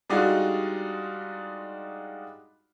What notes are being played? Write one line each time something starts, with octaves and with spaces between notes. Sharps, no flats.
G3 G#3 D4 D#4 F4 F#4